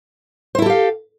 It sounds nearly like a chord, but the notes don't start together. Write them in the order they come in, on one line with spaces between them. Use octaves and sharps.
C5 E4 A4 G4 F5